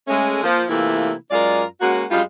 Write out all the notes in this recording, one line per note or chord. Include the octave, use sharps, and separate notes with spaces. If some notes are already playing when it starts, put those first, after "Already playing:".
G#3 A3 C#4
F3 A#3
C3 E3 A3 A#3 E4 F4
F#2 G#3 F4 A#4 D5
G#3 A#3 C#4 F#4
F#2 G3 G#3 F4